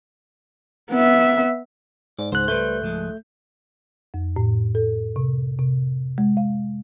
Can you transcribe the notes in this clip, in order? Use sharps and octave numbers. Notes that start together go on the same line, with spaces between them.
B3 E5
G#2 D5
C#2 G#2 C5 F#6
G3 A3 B4 C5 G6
G#2 F3 G#3
F2
A2
A4
C3
C3
G#3
F5